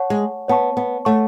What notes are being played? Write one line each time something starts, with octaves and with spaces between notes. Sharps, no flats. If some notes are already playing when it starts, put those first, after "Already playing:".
Already playing: C#5 F#5 A5 C#6
G#3
B3 C#5 F#5 A5 C#6
B3
A3 C#5 F#5 A5 C#6